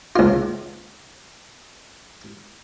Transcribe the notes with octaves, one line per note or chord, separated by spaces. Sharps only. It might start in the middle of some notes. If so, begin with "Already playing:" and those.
C#2 F4